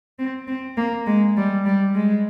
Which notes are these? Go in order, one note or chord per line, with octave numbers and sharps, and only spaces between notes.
C4
C4
A#3
G#3
G3
G3
G#3